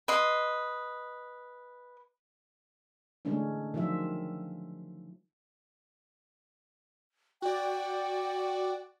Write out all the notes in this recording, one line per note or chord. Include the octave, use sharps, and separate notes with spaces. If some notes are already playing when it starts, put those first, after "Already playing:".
B4 D#5 C6
D3 E3 G#3 A3 C#4 D4
D#3 F3 F#3 F4 E5
F#4 D5 G5